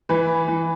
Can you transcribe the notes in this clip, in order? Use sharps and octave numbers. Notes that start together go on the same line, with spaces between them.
E3 B4
E3